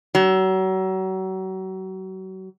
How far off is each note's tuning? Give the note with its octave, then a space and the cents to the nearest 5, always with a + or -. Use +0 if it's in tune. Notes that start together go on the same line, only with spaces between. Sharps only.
F#3 +35